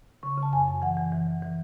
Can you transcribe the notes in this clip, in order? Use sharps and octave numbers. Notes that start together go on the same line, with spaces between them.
C#3 C#6
C#3 A5
F#2 G#5
F#2
E3 F#5
E3
E3
E3
E3